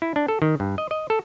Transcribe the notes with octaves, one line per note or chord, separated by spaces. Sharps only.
E4
D4
A4
D#3
G2
D#5
D#5
A4